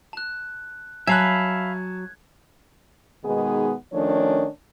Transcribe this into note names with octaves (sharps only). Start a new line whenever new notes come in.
A5 F#6
F#3 E5 F5 G#5 A5 B5 F#6 G#6
B2 D#3 G#3 B3 D#4 G#4
D#3 F3 A3 C#4 D4 C#5